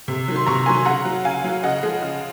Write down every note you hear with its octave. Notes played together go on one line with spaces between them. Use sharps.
C3
D#3 F#3
C6
C3 A#5 C#6
D#3 F#3 G#5 C6
C#3 F#5 A#5
F#3
C#3 F5 G#5
F#3
C#3 D#5 F#5
F3 G#3
C#3